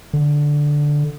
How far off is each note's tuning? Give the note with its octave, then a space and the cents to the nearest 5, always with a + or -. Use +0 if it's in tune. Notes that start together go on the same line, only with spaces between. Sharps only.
D3 +0